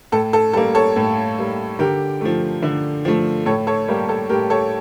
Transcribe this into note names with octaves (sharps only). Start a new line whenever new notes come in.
A2 A4
A4
G3 A#3 A4
A4 C#5
A2
G3 A#3
D3 G4 A#4
F3 A3
D3
F3 A3
A2 A4 C#5
A4 C#5
G3 A#3 G4 A#4
A4
A2 G4 A#4
A4 C#5